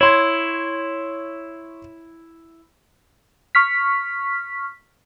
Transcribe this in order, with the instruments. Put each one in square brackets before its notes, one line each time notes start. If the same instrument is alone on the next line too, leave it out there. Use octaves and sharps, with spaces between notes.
[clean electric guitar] E4 [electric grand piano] C#5 C6 G#6
[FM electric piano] C#6 F6 B6